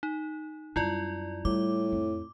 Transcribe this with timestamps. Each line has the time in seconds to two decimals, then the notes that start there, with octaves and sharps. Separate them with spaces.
0.03 D#4
0.76 F#2 G3 E4 F4 D5
1.45 A2 G3 D6
1.92 F2